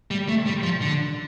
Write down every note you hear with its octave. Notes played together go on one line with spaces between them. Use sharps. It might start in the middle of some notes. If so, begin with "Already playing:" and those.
G3
A3
G3
F3
D3